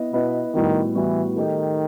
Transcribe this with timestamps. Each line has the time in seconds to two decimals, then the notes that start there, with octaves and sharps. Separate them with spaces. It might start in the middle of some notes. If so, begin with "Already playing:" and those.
Already playing: B3 E4 B4 D#5
0.13 B2 B3 E4 B4 D#5
0.54 A2 D#3 G3 B3 F#4
0.95 A2 E3 G3 B3 F#4
1.36 D#3 A3 D#4 G4